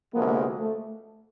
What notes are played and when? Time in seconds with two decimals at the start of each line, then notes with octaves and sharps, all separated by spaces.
0.14 D2 C3 F3 G#3 A#3 B3
0.59 A3